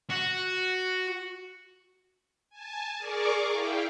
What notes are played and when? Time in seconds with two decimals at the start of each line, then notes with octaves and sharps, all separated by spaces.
0.10 F#4
2.50 G#5 A5
2.97 G#4 A#4 D5 C#6 D6
3.50 E4 F5 G5